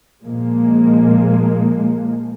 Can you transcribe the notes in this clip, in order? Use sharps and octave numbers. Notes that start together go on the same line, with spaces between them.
A#2 F3 G#3 A#3